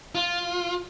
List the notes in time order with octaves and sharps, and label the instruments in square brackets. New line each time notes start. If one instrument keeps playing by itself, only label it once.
[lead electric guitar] F4